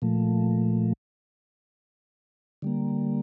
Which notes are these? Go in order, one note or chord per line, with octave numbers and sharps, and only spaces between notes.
A#2 F3 A3
D3 G3 A#3